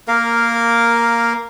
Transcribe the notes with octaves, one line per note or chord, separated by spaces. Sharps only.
A#3 A#4 F5